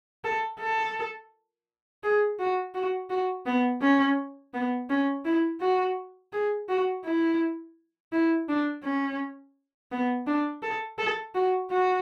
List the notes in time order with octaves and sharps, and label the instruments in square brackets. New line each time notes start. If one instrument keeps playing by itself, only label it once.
[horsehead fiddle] A4
A4
G#4
F#4
F#4
F#4
B3
C#4
B3
C#4
E4
F#4
G#4
F#4
E4
E4
D4
C#4
B3
D4
A4
A4
F#4
F#4